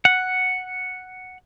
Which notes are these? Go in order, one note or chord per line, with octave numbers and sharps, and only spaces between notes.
F#5